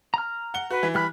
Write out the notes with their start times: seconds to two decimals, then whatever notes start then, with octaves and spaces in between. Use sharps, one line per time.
0.14 A#5 F6
0.54 F#5 G7
0.70 F#4 B4
0.83 E3
0.95 G3 B5 F6 F#6